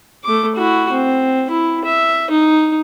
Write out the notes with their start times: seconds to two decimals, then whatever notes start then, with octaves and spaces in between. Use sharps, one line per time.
0.24 A3 D6
0.56 E4 F#4
0.93 C4
1.50 E4
1.85 E5
2.30 D#4